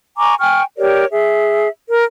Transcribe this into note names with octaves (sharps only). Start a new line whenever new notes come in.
G#5 A#5 C#6 D6
G5 G#5 C#6 F6
G4 A#4 C#5 D5
G#4 E5
A#4